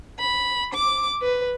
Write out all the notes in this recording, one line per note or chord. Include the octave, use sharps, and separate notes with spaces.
B5
D6
B4